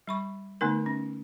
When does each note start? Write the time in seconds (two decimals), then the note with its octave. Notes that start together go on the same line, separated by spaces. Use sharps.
0.07 G3 B5 C#6
0.61 D3 A3 B3 D#4 A#4
0.86 C#4